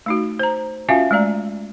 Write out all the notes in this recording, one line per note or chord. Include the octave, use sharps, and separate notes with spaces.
A3 D#4 F#4
C5 A#5
C#4 F4 F#4 E5 F5 G#5
G#3 A3 D5 A#5